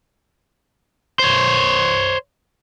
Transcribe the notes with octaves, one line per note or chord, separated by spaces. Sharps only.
C5 C#5